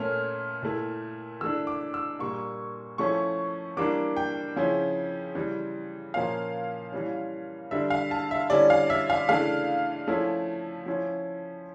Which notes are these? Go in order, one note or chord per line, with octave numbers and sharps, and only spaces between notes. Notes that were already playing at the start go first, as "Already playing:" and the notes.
Already playing: A#2 A3 C#4 F6
A#2 A3 E4
E3 A3 D4 E6
D6
E6
A#2 G3 A#3 C#6
F3 A3 C#4 E4 C#6
E3 G3 A#3 D4 D6
G5
C#3 F3 C#4 E4
C#3 E3 G3
A#2 F3 A#3 C#4 F5
E3 G3 C#4
D3 G3 D4 E5
F5
A5
E5
D3 G3 C#4 E4 D5
F5
E5
F5
C#3 E3 A3 D4 F5
F3 A3 C#4 E4
F3 C#4 E4